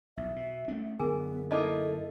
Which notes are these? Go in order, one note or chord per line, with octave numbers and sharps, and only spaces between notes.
B1 E2 E5
B2
A3 C#4 D4
F#2 D3 B3 G#4 A#4 G#5
A#3 D#4 E4 A4 D#5 A5 D6